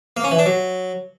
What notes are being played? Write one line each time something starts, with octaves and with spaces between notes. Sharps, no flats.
A#3
C#4
E3
D4
F#3